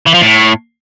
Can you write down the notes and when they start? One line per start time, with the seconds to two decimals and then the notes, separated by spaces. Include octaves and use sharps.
0.06 E3
0.14 F3
0.22 A2